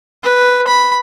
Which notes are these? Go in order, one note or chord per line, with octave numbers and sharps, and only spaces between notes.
B4
B5